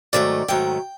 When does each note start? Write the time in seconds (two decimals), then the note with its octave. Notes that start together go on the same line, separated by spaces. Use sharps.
0.13 G#2 D#3 F#3 A3 D5
0.48 G#2 D#3 F#3 A3 G5